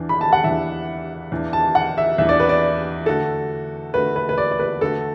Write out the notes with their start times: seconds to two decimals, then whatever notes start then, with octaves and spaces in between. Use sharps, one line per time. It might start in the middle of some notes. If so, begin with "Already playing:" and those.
Already playing: E2 E3 D4
0.09 B5
0.21 A5
0.33 F#5
0.44 E2 E3 D4 E5
1.32 E2 E3 D4
1.53 A5
1.75 F#5
1.98 E5
2.18 E2 E3 D4 E5
2.29 D5
2.40 B4
2.49 D5
3.06 D3 A3 F#4 A4
3.94 D3 A3 F#4 B4
4.16 B4
4.29 B4
4.38 D5
4.51 D5
4.59 B4
4.81 D3 A3 F#4 A4